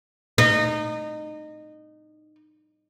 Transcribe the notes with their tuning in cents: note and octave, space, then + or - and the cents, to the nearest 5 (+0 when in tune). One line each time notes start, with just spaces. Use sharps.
D#4 -25